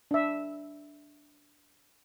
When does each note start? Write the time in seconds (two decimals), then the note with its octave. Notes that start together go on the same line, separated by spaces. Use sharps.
0.11 D4 E5